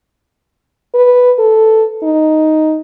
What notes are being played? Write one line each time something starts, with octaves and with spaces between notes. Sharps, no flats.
B4
A4
D#4